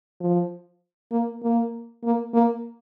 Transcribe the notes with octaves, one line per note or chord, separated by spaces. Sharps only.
F3
A#3
A#3
A#3
A#3